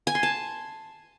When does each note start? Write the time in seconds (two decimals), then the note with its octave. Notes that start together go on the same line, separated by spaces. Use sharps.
0.07 G#5
0.15 C6
0.23 A5